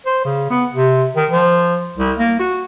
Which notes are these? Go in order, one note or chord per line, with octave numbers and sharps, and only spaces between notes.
C5
C#3
B3
C3
D#3
F3
C2
A#3
F#4